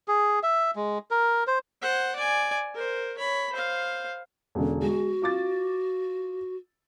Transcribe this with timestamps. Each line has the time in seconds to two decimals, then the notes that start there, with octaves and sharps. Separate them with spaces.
0.08 G#4
0.43 E5
0.76 G#3
1.11 A#4
1.47 C5
1.82 C5 F#5
2.16 D5 G#5
2.74 A#4 C5
3.17 C#5 B5
3.53 C5 F5
4.55 E1 D3
4.82 G#3 F#4
5.22 F4 D6 A6